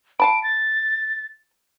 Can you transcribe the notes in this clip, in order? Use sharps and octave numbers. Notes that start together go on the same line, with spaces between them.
F5 A5 B5 D7
A6